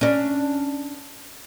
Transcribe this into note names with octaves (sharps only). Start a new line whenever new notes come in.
C#4 D4